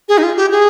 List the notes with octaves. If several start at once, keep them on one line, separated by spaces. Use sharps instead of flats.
G#4
D#4
F4
G4
G#4